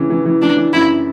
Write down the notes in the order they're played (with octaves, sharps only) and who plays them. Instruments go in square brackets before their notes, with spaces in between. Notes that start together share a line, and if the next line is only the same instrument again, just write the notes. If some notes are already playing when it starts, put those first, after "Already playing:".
Already playing: [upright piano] C#3 E3
E3
E3
[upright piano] E3 [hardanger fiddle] D4
[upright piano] E3
[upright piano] F#2 [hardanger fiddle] E4